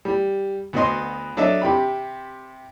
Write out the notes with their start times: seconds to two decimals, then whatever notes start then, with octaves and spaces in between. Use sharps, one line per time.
0.05 G3
0.73 D2 B3 F#4 B4 D#5 C6
1.37 F#3 D4 A4 D#5 E5
1.62 C3 G4 B5